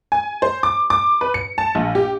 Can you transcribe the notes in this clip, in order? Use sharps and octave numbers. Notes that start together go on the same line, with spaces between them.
G#5
C5
D6
D6
B4
C#7
A5
A#1
G4